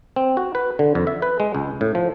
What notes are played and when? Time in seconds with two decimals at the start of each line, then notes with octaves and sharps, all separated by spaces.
0.16 C4
0.37 F#4
0.55 B4
0.79 D3
0.95 F2
1.07 E5
1.22 B4
1.40 G#3
1.55 C#2
1.81 A2
1.95 F3